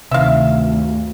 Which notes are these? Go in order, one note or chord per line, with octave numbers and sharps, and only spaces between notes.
D2 G2 C3 D#3 E5 F5